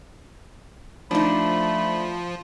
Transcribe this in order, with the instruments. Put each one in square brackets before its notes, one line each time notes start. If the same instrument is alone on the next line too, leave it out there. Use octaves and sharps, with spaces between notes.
[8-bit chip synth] F3 [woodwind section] A3 [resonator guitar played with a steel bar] D4 D#4 [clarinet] B5